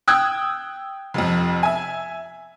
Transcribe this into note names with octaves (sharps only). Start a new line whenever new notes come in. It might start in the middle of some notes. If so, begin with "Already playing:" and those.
G5 D#6 E6 F#6 G#6
F1 F2
E5 G#5